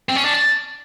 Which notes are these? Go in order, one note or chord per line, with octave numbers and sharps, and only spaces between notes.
C4
C#4
D4